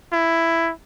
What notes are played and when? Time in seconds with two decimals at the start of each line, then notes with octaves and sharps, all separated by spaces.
0.12 E4